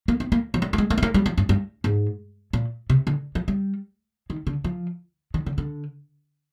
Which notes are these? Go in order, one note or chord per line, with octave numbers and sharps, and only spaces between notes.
A#3
C4
A#3
F3
G3
A#3
G#3
A#3
C4
A#3
G3
F3
G2
G2
G#2
A#2
C3
D3
F3
G3
D#3
D3
F3
D#3
D3
D3